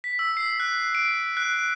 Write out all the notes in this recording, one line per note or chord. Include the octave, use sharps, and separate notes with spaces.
B6
E6
C7
F#6
D7
F#6